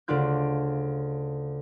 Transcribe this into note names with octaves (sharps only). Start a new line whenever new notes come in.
D2 C#3 D4 F4 G6